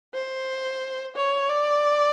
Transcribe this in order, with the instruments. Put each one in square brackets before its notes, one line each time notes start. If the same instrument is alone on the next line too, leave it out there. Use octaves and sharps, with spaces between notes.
[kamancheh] C5
C#5
D5